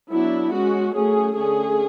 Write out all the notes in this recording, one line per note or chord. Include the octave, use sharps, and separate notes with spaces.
F#3 B3 D4 E4
G#3 C#4 F#4
F#3 A3 C#4 G#4
D3 A3 C#4 G#4